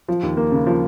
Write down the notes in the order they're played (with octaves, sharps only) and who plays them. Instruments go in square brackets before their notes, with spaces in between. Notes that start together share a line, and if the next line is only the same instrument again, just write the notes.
[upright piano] F3
D#2
A#3
C#3
F3